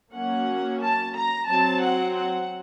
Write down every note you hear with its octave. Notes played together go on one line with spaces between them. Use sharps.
F#3 A#3 C#4 F#5
A5
A#5
F#3 C4 A5
F#5
F#5